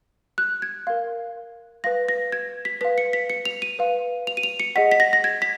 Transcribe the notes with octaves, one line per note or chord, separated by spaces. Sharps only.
F#6
G#6
A#4 F5
B4 F5 A#6
A#6
G#6
B6
B4 F5 B6
C#7
B6
C#7
F7
D#7
B4 F5
F7
D#7
F7
C#7
G#4 D#5 F#5 B6
B6
A#6
A#6
G#6
B6